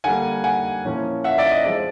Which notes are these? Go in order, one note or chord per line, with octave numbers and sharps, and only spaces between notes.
D3 G3 A#3 F#5 G#5
F#5 G#5
A#2 F3 A#3 C#4 E4
E5 F#5
D5 E5
D#5
F3 G#3 C4 D5